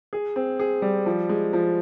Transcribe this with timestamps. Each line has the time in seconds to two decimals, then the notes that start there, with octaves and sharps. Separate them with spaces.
0.13 G#4
0.36 C4
0.59 G#4
0.82 G3
1.06 F3
1.29 G#3
1.53 F3